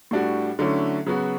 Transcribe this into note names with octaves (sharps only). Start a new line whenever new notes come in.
A2 G3 D4 F#4
D3 F#3 A3 C#4 E4
C#3 F#3 B3 F#4